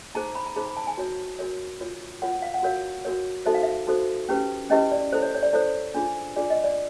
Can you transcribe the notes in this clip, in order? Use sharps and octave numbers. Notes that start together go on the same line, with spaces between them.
D#4 G#4 C5 A#5
B5
A#5
D#4 G#4 C5 B5
B5
A5
G#5
F#4 A#4 C#5
F#4 A#4 C#5
F4 A#4 C#5
F4 A#4 C#5 F#5
F5
F#5
F#4 A#4 C#5 F5
F#4 A#4 C#5
D#4 F#4 A4 C5 E5
F5
E5
D#4 F#4 A4 C5
C#4 E4 G4 B4
C#4 E4 G4 B4 D#5
D5
E4 A4 C5
C#5
C#5
D5
E4 A4 C5 C#5
D4 F4 G#4
D4 F4 G#4 D5
D#5
D5